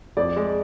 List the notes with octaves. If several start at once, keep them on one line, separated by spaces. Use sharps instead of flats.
F2 D5
G#3